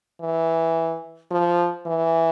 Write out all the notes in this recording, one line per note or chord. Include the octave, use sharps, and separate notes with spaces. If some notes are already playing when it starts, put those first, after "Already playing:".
E3
F3
E3